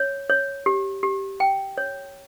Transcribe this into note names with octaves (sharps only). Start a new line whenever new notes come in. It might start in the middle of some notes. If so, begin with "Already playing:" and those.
Already playing: C#5
C#5
G4
G4
G5
C#5